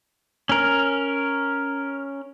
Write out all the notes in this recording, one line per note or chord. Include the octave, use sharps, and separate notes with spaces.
C#4 A#4